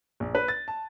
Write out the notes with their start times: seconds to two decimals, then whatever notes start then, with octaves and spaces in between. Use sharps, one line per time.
0.20 A#1
0.35 B4
0.48 A6
0.68 A5